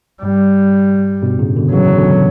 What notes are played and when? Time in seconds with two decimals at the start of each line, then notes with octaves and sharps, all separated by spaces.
0.23 G2 G3
1.22 G2 B2
1.39 A2 C#3
1.56 B2 D3
1.72 C#3 E3 F#3
1.98 B2 D3